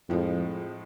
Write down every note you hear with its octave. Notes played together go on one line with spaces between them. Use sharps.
F2 A2 F3 G#3